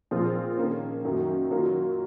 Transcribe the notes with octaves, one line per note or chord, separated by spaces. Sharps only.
A#2 F3 C4 F4 G#4
D#3 A#3 C#4
F#2 D#3 F#3 A#3
D#3 F#3 A#3 F4 A#4